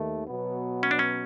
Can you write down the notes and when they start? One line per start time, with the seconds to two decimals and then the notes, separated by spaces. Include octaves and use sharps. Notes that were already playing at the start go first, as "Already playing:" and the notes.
Already playing: D#2 D#3 A3
0.27 B2 F#3 B3
0.83 C#4
0.91 D4
0.99 C#4